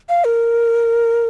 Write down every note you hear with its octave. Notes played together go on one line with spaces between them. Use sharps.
F5
A#4